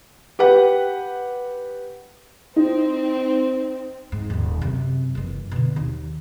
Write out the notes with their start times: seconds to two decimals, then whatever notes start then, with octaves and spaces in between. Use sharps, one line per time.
0.39 G4 B4 F#5
2.56 C4 D#4
4.12 G#2
4.30 D#1 D#2
4.61 F#2 C3
5.15 F#1 E3
5.51 B2 D3
5.76 D#2